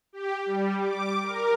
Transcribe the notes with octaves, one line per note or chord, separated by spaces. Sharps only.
G4
G3
D6
A#4